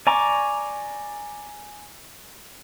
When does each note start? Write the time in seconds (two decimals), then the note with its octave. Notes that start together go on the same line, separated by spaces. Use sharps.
0.07 D5 G#5 A#5 C#6 D6